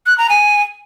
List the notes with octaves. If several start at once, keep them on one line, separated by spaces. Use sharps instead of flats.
F#6
A#5
G#5